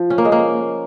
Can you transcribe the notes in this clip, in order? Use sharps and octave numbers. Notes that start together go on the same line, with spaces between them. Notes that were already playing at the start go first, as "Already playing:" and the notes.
Already playing: F3
C#4
A#3
G#3
A#3